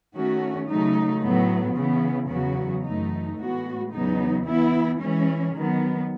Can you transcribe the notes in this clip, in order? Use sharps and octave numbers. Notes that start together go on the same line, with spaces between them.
D#3 A3 C#4 F#4
C#3 F#3 A3 D#4
A2 F#3 B3
C#3 E3 B3
E2 C#3 F#3 B3 F#4
F#2 E3 A3 D#4
A2 G#3 B3 F#4
E2 C#3 F#3 B3 D#4
E3 B3 E4
E3 G#3 C#4
D#3 F#3 B3